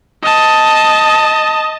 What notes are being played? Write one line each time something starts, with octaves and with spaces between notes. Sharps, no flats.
D#5 A5